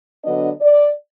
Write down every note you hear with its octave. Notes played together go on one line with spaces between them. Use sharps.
D3 F#3 B3 D4 D#5
D5